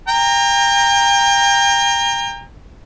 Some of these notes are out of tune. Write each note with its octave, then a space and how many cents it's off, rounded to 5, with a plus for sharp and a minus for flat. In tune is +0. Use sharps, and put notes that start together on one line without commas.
G5 +35 A#5 -10